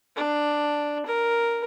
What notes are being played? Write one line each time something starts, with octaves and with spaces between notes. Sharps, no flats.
D4
A#4